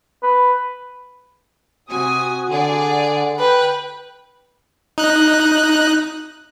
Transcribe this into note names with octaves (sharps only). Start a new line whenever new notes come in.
B4
C3 F#4 G#5 D#6
D3 G#4 D5 F#5
B4 G5
D#4 F#6